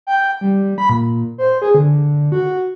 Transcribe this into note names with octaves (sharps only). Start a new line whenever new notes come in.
G5
G3
B5
A#2
C5
G#4
D3
F#4